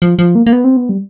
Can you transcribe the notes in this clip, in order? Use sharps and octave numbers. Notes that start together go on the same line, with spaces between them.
F3
F3
A#3
A#3
B3
C4
B3
G3